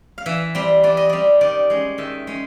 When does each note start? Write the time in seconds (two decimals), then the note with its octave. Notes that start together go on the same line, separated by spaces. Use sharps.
0.18 F5
0.26 E3 E5
0.55 G3 C4
0.83 E3 D5
0.97 D#5
1.09 G3 C4 D5
1.41 D#3 D5
1.70 G#3 C#4
1.98 D#3 E5
2.27 G#3 C#4